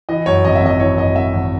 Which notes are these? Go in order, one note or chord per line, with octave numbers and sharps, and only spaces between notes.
E3 D#5
F#2 C#5
G#1 D#5
E5
G#1 D#5
E3 C#5
F#2 D#5
G#1 E5
G#1